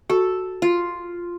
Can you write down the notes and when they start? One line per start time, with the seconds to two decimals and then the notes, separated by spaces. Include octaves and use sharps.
0.10 F#4 A4
0.62 F4